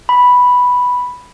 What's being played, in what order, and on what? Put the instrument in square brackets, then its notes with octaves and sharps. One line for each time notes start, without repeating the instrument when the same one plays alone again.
[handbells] B5